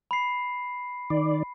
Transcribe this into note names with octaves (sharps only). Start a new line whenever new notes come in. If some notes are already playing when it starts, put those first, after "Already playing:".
B5 C7
D#3 D5